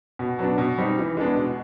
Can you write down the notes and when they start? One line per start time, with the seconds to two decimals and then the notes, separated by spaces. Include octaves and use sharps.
0.19 B2
0.39 F#3 B3 D4
0.58 B2
0.78 G3 C4 D#4
0.98 E3
1.17 G#3 B3 D4
1.36 B2